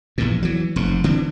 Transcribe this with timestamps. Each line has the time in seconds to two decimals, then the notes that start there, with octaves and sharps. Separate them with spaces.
0.18 A#1 E2 G2 A#2
0.43 E3 F#3
0.76 F1 G#2
1.04 D3 E3 C4 D4